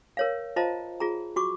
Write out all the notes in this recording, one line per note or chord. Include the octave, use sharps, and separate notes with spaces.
A#4 C#5 F5
F4 C5 D#5 F5 A5 A#5
F4 G#4 A#5
F#4 C#6 D6